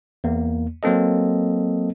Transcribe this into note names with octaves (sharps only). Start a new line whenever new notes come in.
E2 A#3
F#3 A#3 C4 A4 D#5